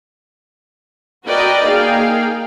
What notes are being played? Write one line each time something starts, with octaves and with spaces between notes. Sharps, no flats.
F#4 A#4 B4 D5 D#5 G5
A#3 D#4 G#4 F5 G5